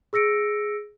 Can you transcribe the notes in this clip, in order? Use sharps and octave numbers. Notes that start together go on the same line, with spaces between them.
G#4 E6 A#6 C#7 D7